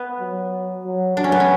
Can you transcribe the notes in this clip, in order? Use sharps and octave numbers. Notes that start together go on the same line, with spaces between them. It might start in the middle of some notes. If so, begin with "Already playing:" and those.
Already playing: B3
F#3
F#3
F#3 D4
C#4
B3
C#4